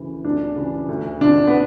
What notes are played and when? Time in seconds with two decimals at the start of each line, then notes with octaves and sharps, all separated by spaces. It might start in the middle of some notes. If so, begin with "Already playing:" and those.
Already playing: D2 C#3 E3
0.24 D2 D4
0.56 C#3 E3
0.88 D2
1.21 D3 D4
1.47 B3